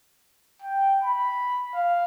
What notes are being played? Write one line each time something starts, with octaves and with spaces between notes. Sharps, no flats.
G5
B5
F5